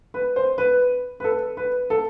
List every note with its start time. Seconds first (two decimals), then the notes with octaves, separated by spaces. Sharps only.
0.14 B4
0.36 C5
0.58 B4
1.20 B4
1.24 A4
1.57 B4
1.90 A4